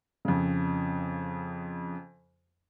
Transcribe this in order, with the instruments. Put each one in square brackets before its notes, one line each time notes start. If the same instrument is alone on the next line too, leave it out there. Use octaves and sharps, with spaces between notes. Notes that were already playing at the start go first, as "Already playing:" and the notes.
[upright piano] F2 C#3